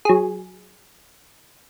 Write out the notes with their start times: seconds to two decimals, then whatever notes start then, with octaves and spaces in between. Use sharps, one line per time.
0.05 F#3 G#4